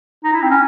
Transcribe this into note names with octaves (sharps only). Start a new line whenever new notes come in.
D#4
E4
C4
C#4